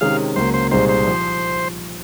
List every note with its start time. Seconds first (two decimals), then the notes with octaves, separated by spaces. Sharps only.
0.01 C3 D#3 G#3 C#4 G#4 F5
0.36 C#2 C#3 F#3 A#3 C5
0.54 C5
0.71 C2 A#2 G#3 C4 D#4 C5
0.89 C5
1.07 F3